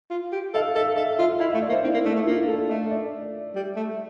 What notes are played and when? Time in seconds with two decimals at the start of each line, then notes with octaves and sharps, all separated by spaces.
0.10 F4
0.32 G4
0.54 A4 F5
0.75 A4 E5
0.96 A4 E5
1.19 F4 E5
1.40 E4 F5
1.50 A3 E5
1.62 D5
1.69 A#3
1.72 C5
1.83 C4 E4
1.94 A#3
2.04 A3 D4
2.15 A3
2.26 A#3 F4
2.48 A4
2.69 A3 E5
2.91 D5
3.55 G3
3.76 A3